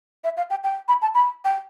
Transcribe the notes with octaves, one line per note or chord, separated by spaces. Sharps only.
E5
F5
G5
G5
B5
A5
B5
G5